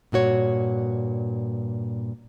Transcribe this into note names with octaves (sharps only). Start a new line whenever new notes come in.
G2 A#2 F#4 C#5